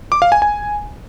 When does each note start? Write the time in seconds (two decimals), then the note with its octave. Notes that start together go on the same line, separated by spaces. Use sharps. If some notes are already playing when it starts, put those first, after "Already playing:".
0.12 D6
0.22 F5
0.32 G#5
0.42 G#5